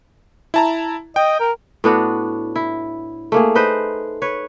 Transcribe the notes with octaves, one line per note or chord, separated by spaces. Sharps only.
E4 A5 A#5
D#5 G5
A#4
A2 B3 D4 F#4
E4
A3 A#3 G#4
D#4 B4 C5
B4 C#5